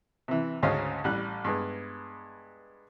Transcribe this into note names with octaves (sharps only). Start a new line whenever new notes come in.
C3 E3
D2 G#2 C#3 C#4 D#5 F5
A1 G3 F#6
G2 G#3 B3